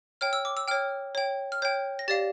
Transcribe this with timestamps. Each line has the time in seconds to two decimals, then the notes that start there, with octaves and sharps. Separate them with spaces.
0.21 C#5 G5 F6
0.33 E6
0.45 D6
0.57 E6
0.68 C#5 G5 F6
1.15 C#5 G5
1.52 F6
1.62 C#5 G5 G6
1.99 A#6
2.08 G4 D5 F5 A6